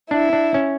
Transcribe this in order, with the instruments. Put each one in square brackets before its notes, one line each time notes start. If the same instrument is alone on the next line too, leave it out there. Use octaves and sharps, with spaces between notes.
[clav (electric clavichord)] D4 [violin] E4
[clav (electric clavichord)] D4
C#4